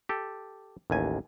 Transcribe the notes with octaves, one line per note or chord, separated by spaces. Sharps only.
G4 A4
A1 D#2 G#5